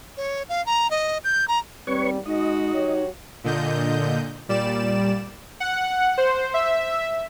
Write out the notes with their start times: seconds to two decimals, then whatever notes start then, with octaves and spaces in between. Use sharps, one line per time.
0.17 C#5
0.49 F5
0.66 A#5
0.91 D#5
1.24 G6
1.48 A#5
1.87 D#2 G#2 G3 C4 B4 C#5 C#6
2.26 G#3 D#4 F#4 D#5
2.74 F#3 G4 C#5
3.44 A#2 D3 D#5 G6
4.49 A#2 G3 D5 E7
5.60 F#5
6.18 C5
6.54 E5